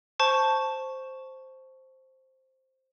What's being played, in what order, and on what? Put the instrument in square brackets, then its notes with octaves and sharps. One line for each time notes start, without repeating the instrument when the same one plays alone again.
[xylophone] C5 A5 C#6